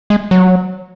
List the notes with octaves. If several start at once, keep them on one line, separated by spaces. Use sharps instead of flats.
G#3
F#3